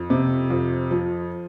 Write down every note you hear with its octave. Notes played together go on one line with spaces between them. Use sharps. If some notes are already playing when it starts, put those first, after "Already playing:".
Already playing: F2
C3
F2
F3